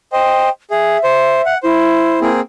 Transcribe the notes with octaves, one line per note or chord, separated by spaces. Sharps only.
C5 D#5 G5
G#4 E5
C5
F#5
E4 C5
A#3 C4 G#4